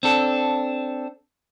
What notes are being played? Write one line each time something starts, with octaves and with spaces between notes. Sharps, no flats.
C4 D4 A4